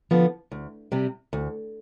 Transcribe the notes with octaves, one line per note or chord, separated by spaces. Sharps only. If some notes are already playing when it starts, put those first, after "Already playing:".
D3 F3 B3
D2
C3 G3
D2